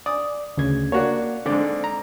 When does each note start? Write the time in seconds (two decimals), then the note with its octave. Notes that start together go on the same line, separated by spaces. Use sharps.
0.06 D5 D#6
0.57 D2 C#3 G#6
0.92 A#3 D4 F#4 C#5
1.46 G#2 D3 C4 D5
1.84 A#5